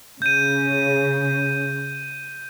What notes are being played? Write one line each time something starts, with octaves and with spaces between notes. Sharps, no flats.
C#3 G6 D#7